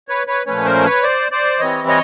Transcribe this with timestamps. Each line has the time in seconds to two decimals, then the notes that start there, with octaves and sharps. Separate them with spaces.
0.08 B4 C#5
0.27 B4 C#5
0.46 A#2 F3 A3 C#4 B4 C#5
0.65 A#4 C5
0.85 B4 C#5
1.03 C5 D5
1.31 C5 D5
1.59 E3 G3 C4 C#5 D#5
1.88 C#5 D#5